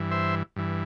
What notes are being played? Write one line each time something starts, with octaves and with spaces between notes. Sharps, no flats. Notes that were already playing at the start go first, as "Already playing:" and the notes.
Already playing: G2 E3
C5 E5
G2 E3